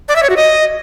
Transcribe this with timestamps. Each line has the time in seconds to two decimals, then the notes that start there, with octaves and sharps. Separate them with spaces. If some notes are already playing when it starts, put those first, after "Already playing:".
0.09 D5
0.16 E5
0.23 C#5
0.30 F#4
0.37 D#5